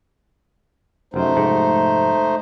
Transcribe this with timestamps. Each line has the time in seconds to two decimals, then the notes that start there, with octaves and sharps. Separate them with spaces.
1.14 F1 F#2 A3 D#4 C5
1.35 F1 G#2